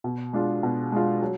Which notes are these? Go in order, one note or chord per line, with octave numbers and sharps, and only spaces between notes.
B2
G#3 D4 F4
B2
G#3 D4 F4
F#3